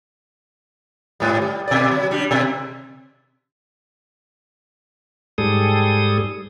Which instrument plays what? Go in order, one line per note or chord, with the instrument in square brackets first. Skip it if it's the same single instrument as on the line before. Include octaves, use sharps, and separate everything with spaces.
[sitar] G#2 G3
G3
B2 D5
F#3
G3 D4
B2
[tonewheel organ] G#2 G3 G#4 A4 D#6